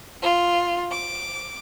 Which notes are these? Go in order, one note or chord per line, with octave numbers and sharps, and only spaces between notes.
F4
D6